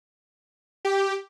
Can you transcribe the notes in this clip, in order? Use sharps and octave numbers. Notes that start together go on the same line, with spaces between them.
G4